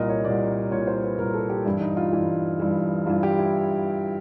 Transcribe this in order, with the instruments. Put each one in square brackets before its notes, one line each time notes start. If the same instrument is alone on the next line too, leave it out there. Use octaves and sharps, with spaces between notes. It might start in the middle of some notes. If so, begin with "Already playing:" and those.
Already playing: [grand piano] C2 A#2 A#4 D#5
C#5
C2 A#2 D5
C2 A#2 C#5
C5
B4
C2 A#2 A#4
A4
G4
G2 E3 E4
D#4
F4
G2 E3
G2 E3
G2 E3 F4
G4
E4